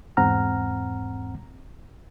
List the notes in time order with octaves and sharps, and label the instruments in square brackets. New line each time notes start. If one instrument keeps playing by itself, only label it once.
[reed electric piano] E2 G#2 C4 F#5 A#5 F6